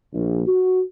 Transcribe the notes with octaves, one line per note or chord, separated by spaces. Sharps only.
A#1
F#4